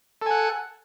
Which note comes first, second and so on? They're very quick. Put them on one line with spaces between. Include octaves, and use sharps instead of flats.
A4 G#5 F#5